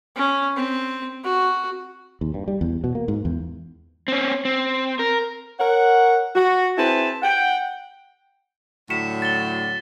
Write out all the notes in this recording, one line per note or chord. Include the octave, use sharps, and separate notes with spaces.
C#4
C4
F#4
D#2
G2
G3
E2
B2
A#3
G#2
E2
C4 C#4
C4
A#4
A#4 C#5 F#5
F#4
C4 E4 G#4 B4 A5
F#5 G5
A2 D3 F#3 B6 C#7 E7
A6 G7